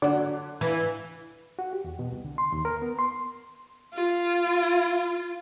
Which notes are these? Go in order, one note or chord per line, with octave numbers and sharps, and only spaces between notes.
D3 F#3 D5
E3
F#4
G4
E2
B2
C2
D3
C6
D#2
A#4
B3
C6
F4